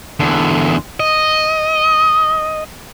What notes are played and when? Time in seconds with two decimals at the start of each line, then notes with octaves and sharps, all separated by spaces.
0.20 E2 D3
1.00 D#5